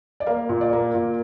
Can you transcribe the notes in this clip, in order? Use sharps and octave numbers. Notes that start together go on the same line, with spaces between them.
D5
A#3 F5
A#2
D5
A#3
A#2